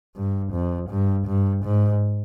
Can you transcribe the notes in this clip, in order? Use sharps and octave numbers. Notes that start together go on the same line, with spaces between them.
G2
F2
G2
G2
G#2